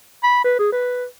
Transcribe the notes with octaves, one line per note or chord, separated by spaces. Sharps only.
B5
B4
G#4
B4